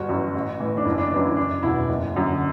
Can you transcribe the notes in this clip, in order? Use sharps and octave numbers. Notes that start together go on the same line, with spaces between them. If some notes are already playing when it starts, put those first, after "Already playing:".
Already playing: G1 F#4
F#2 E3
A1
A2 E3
D4
F#1 E4
D4
F#2 E3 D4
E4
F#1 D4
E2 B2 E4
F#1
F#2 D3